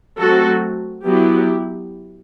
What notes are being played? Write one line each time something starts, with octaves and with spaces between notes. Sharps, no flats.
F#3 A3 C4 F#4 A4
F#3 B3 E4 G4